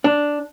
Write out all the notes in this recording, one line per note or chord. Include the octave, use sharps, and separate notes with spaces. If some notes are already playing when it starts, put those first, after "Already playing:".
D4